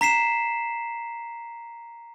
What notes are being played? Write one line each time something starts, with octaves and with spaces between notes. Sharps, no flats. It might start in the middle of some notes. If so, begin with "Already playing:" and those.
A#5 B6 C7 E7